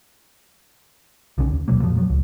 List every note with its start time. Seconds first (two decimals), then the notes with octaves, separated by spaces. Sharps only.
1.38 B1 D3 D#3 C#4
1.52 D#2
1.68 D#1 B2 F#3 A#3
1.82 F2 A#2 F3
1.95 A#2 F3 F#3
2.09 C#2